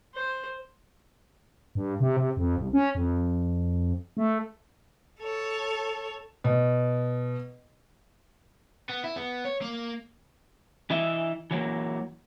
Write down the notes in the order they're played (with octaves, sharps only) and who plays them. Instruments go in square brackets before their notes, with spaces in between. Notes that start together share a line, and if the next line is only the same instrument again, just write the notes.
[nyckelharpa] C5
[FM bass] G2
C3
C3
F2
C2
C#4
F2
A3
[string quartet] A4 C#5
[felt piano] B2
[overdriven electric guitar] B3
E4
B3
C#5
A#3
[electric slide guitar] E3 E4 D#5 E5
E3 F#3 A#3